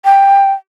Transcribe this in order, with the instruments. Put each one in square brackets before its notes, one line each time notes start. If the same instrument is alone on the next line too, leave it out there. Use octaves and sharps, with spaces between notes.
[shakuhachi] G5